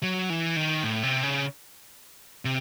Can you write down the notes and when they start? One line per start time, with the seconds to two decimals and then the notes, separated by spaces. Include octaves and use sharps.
0.03 F#3
0.30 E3
0.56 D#3
0.83 A2
1.03 C3
1.23 C#3
2.45 C3